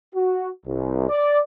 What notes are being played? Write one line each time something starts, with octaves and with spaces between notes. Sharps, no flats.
F#4
C2
D5